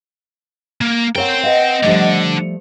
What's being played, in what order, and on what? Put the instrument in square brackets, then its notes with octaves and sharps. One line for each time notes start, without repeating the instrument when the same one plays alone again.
[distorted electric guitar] A#3
[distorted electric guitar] C4 G5 [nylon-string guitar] A#4 C#5 F#5
[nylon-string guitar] B4 F5 [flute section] D#5 F#5
[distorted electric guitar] D3 D4 [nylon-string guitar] F3 G3 A3